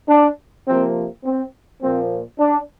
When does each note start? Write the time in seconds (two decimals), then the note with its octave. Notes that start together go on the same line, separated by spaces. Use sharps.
0.08 D4
0.67 C3 F3 A#3 C4
1.24 C4
1.81 A#2 F3 A#3 C4
2.39 D4